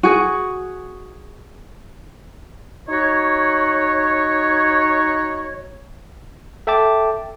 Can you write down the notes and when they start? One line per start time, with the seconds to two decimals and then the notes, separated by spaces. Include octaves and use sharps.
0.03 F#4 G#4
2.89 D#4 F#4 C#5
6.67 A4 E5 G5 A5 D6